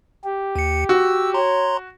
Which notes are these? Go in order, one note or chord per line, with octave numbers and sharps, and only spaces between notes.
G4
D#2 C#7
F#4 E6
C#5 A#5 C6